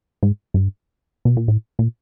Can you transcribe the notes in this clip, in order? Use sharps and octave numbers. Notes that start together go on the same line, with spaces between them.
G#2
G2
B2
A#2
A2
A#2